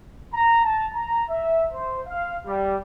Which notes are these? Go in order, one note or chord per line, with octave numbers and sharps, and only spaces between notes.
A#5
A5
A#5
E5
C5
F5
G3